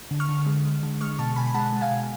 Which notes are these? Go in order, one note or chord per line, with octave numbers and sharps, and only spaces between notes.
D3
C#6 F6
D3
G#3
G#3
D3
G#3 C#6 F6
B2 A5 C#6
B2 G#5 B5
B5
G#3 F#5 A5
G#3
F5 G#5
B2